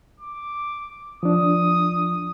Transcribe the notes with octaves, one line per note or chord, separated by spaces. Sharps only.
D6
F3 D4 D#6